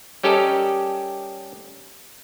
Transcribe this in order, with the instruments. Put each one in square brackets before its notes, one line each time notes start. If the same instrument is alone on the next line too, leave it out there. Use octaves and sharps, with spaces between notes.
[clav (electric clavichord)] G3 C#4 G4 A4 A#4 D#5